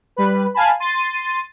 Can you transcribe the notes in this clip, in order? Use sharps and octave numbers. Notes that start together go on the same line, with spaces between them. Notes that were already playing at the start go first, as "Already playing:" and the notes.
G3 B4
F5 G#5 A5 B5
C6 A6 D#7